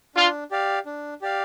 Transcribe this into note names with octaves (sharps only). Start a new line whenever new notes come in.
D4 F4
G4 D5 F5
D4
G4 D5 F5